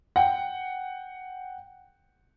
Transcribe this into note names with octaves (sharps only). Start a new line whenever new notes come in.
F#5 G5